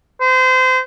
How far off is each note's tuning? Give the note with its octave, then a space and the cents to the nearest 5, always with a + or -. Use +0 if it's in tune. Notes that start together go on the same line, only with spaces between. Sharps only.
C5 -30